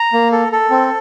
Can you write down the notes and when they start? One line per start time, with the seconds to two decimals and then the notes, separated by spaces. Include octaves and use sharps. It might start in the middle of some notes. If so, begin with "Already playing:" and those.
Already playing: A#5
0.13 A#3
0.32 A4
0.52 A4
0.71 C4